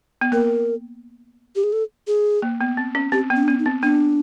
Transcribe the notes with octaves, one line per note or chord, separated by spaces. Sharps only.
B3
A#3 A#4
G4
G#4
A4
G#4
A#3
B3
C4
C#4
C4 G4
B3
C#4
D4
B3 C#4
D#4
C4
B3 D4